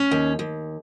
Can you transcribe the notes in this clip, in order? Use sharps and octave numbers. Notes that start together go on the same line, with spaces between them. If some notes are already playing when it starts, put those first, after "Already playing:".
Already playing: C#4
D#2
D#2